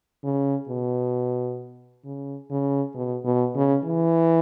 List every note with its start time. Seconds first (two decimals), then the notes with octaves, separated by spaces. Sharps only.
0.24 C#3
0.68 B2
2.05 C#3
2.50 C#3
2.94 B2
3.24 B2
3.55 C#3
3.85 E3